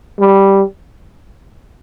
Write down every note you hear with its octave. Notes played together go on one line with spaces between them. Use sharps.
G3